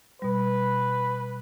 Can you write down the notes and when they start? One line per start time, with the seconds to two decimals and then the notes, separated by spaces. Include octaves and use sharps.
0.22 B2 G3 B4